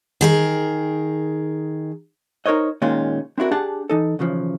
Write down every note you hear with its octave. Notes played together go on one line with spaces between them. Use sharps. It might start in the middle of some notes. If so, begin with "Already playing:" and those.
D#3 G#4 A#4
D#4 A#4 C5 C#5 D#5
A#2 D#3 G#3 C#4 F4
C4 D4 E4 F#4 A#4
D4 G4 G#4 F#5 A5
E3 D#4 A4
B1 C#3 E3 F3